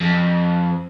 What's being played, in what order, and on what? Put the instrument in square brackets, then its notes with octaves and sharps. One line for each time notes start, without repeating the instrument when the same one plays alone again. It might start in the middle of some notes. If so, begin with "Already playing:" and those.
[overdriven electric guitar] F2